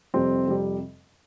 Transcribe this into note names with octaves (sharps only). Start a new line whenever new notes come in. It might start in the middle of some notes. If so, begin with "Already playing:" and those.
F2 C3 G3 C4
F2 C3 G3